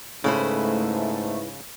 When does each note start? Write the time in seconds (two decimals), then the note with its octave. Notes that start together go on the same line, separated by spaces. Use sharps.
0.24 G#2 C#3 A3 E4 B4 C5